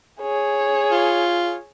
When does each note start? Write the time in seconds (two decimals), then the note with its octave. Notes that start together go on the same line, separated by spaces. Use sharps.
0.21 G#4 C#5
0.91 F4